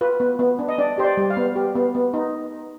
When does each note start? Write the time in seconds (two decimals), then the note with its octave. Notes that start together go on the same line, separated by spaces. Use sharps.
0.01 F4 B4
0.20 B3
0.39 B3
0.59 D4
0.68 D#5
0.78 D4 D5
0.98 G4 C5
1.04 D5
1.17 G3
1.30 F5
1.37 B3
1.56 G4
1.75 B3
1.95 B3
2.14 D#4